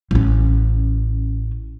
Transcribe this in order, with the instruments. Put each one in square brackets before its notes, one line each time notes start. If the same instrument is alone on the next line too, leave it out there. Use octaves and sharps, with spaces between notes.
[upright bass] A1 C#4